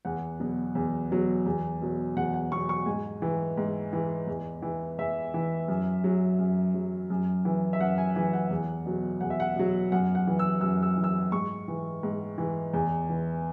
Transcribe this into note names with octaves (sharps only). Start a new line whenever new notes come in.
E2 F#5
B2 F#3
E2
B2 F#3
E2
B2 F#3
E2 F#5
F#5
B2 F#3 C#6
C#6
G#2 G#5
E3
G#2
E3
E2
E3
E2 E5
E3
F#2
F#3
F#2
F#3
F#2
E3
E5
F#2 F#5
G#5
E3 G#5
F#5
E2
B2 F#3
E2 F#5
E5
F#5
B2 F#3
F#2 F#5
F#5
E3
E6
F#2 E6
E6
E3
E6
G#2 C#6
E3
G#2
E3
E2
E3